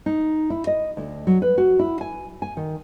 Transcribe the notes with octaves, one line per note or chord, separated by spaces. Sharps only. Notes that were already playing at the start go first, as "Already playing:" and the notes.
D#4
E4
D#5
D2
F#3
B4
F#4
E4
G#5
G#5
D#3